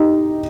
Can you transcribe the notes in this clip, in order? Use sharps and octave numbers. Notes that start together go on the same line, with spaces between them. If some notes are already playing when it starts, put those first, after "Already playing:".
Already playing: D#4 G4